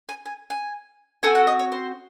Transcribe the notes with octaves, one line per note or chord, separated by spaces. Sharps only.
G#5
G#5
G#5
C4 F#4 A4 G#5
F#5
D#5
C#5
C5